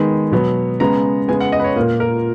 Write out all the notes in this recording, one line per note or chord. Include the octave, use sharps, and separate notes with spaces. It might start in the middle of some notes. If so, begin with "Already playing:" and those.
Already playing: D#3 G#3 B3 B5
B2 F#3 B3
C#3 G#3 B3 A#5
C#3 G#3 B3 G#5
F#5
D#5
B4
C#5
A#2 A#3
A#4